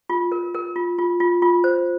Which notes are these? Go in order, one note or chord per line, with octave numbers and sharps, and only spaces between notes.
F4
A#4
A#4
F4
F4
F4
F4
C5